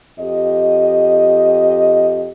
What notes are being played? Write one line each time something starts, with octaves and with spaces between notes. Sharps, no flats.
F2 G4 D#5